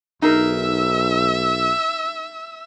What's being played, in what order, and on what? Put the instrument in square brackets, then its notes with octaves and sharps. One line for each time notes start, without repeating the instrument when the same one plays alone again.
[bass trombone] B1 [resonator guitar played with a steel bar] D#4 G#4 A#4 [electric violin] E5 E6